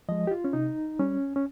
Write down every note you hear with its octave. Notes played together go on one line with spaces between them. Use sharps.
F3 G#3 D#5
G4
F4
C#4
C3 D#4
G3 C#4
C#4